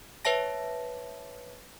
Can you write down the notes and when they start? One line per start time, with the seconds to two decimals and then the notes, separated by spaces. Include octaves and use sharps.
0.25 B4 C#5 E5 A5 A#6